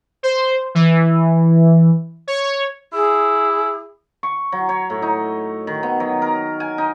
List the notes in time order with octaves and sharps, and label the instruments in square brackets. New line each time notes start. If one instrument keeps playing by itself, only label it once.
[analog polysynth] C5
E3
C#5
[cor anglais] E4 [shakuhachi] G#4
[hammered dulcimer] C#6
F#3
C#5
A2
D#4
D#3
B3
F#3
A#4
G#5
D#4